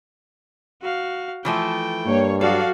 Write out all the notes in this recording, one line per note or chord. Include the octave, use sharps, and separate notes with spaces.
F#4 F5
E3 F3 A3 G5
G2 A#3 C#5
F#3 F#4 A4 D5 F5